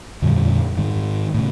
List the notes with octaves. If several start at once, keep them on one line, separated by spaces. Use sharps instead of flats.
F2 A#2 D3 G3
G#2 D#3
A2 C#3